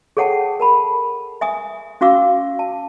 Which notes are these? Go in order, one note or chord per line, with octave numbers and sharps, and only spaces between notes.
G#4 A4 C#5 F#5 G5 A5
A#4 A5 B5
E5 G#5 D#6
C#4 F#4 F5 D6 E6
A5